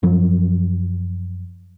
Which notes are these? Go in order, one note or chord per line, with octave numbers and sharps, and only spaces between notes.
F#2 F3 F#3